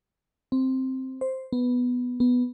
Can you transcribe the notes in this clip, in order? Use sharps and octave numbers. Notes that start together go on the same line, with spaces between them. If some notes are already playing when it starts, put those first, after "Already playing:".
C4
C5
B3
B3